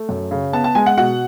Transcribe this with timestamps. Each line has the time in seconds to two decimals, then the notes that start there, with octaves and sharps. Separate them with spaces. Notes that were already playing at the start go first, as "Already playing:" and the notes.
Already playing: A3
0.09 F#2
0.31 C#3
0.53 B3 A5
0.64 A5
0.75 G#3 G#5
0.86 F#5
0.97 B2 F#5